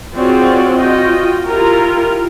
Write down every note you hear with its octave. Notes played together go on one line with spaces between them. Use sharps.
C4 F4 F#4 G#4 C#5 D5
F4 F#4 D#5 G5
E4 F4 G4 A#4